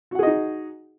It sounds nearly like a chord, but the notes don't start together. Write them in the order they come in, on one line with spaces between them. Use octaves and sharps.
F#4 F#5 G#4 D#5 D#4